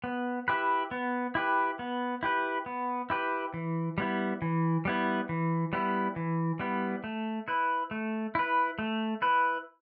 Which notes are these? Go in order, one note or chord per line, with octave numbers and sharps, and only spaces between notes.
B3
E4 G4 B4
B3
E4 G4 B4
B3
E4 G4 B4
B3
E4 G4 B4
E3
G3 B3 E4
E3
G3 B3 E4
E3
G3 B3 E4
E3
G3 B3 E4
A3
E4 B4
A3
E4 B4
A3
E4 B4